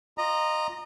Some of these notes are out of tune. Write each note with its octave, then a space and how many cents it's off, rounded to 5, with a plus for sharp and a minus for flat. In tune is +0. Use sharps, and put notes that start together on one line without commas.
F4 +0 D#5 -20 A#5 +0